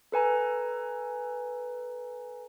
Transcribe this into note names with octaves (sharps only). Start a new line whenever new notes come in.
A4 B4 G#5 A#5